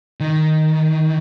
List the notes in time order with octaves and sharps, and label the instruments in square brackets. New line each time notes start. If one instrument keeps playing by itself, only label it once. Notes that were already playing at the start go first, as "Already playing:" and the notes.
[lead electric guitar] D#3